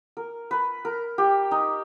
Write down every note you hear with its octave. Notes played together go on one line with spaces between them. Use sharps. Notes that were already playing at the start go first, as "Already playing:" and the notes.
A#4
B4
A#4
G4
D#4